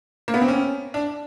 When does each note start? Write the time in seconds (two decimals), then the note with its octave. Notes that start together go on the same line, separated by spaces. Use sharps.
0.28 A#3
0.34 B3
0.42 C4
0.48 C#4
0.94 D4